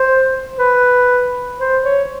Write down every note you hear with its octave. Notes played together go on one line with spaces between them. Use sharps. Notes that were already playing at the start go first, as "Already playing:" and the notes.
Already playing: C5
B4
C5
C#5